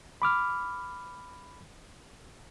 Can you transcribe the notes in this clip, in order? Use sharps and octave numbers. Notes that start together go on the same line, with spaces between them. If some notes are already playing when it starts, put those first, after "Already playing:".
B5 D6 F6